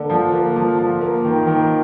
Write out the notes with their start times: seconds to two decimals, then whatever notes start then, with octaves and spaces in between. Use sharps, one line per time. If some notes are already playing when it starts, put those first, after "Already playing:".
Already playing: D3 A#3
0.10 F3
0.33 A#3
0.56 F3
0.78 F3
1.01 A#3
1.25 D#3
1.47 D#3